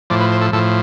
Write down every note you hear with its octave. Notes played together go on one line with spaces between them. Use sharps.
A2 F3 D5
B4
C5
A4
A2 F3 A4